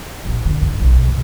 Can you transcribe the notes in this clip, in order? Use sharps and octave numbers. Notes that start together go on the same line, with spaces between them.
A#1 F#3
D3
G2
B1 C#3
C2
G1 C2